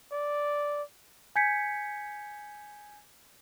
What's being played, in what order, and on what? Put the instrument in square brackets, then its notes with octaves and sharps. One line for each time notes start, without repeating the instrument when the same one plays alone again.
[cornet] D5
[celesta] G#5 G6 G#6 B6 C#7